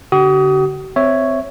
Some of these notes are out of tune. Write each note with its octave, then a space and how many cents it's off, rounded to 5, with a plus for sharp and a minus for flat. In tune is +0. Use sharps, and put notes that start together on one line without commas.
D3 -30 F#4 +45 D#6 +15
C4 -15 C#5 +0 E5 +0